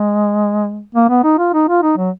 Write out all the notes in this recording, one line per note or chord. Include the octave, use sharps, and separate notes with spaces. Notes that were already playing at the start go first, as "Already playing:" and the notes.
Already playing: G#3
A#3
B3
D#4
F4
D#4
F4
D#4
F#3